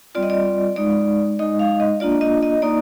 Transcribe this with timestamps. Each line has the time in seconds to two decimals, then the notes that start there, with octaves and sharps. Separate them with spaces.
0.15 G3 C4 F4 D5
0.23 D#5
0.30 D5
0.76 G#3 D#4 D5
1.39 G#3 D#4 D#5
1.59 F5
1.80 D#5
2.00 A#3 D4 F4 D5
2.21 D#5
2.43 D#5
2.62 A#3 D#4 D5